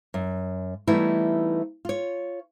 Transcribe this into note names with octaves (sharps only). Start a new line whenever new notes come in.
F#2
E3 G3 A3 B3 D#4 E4
F4 C#5